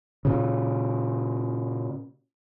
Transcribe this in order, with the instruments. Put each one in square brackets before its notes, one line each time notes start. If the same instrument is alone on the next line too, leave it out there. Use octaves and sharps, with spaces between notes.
[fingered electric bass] A#2 C#3